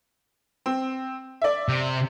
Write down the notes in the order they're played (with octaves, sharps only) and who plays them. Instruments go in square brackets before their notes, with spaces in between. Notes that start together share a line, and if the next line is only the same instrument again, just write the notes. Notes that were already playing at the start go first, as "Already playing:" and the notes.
[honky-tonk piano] C4
D5 E5
[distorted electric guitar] C3